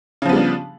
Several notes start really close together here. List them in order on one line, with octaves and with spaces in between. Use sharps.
C#3 F3 B3 G3 D4